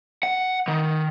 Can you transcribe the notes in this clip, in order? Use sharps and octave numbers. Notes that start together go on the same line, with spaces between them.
F#5
D#3